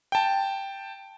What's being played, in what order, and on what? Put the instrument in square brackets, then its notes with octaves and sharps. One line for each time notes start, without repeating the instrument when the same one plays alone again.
[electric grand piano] G5 A5